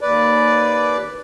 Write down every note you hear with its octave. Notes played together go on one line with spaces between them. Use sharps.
D#2 B4 D5